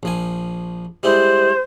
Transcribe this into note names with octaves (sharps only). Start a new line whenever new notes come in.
A#1 F3 G#5
G3 G#3 E4 C5